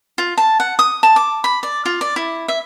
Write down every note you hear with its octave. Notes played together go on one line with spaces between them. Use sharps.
F4
A5
F#5
D#6
A5
D6
B5
D5
F4
D5
E4
E5